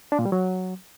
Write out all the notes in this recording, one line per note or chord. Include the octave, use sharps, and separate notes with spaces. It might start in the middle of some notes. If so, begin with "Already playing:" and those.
D4
A#2
G3
F#3